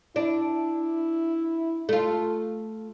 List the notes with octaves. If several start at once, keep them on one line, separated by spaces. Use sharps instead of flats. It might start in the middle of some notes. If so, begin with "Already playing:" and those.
D4 E4
A3 F4